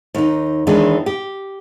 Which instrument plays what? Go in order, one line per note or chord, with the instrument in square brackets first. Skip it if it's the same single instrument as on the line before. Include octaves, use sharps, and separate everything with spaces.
[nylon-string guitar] D#2 D#4
D#2 D#3 E3 G#3 B3 D4
G4